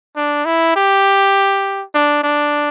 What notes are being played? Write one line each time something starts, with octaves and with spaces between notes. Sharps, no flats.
D4
E4
G4
D4
D4